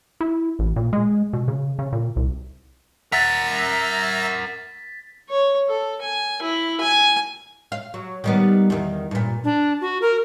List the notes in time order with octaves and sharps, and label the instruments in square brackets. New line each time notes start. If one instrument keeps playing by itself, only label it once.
[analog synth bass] E4
A1
A#2
G#3
B2
C#3
C#3
A#2
C2
[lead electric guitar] A#4 F#5 [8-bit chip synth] E5 A#5 [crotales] A6 B6
[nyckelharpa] C#5
A4
G#5
E4
G#5
[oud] F5
F#3
D#3 G3 B3
E2 D#3
G2 A#2
[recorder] D4
F#4
A#4